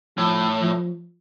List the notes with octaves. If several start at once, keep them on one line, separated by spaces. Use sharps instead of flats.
A2 F3
F3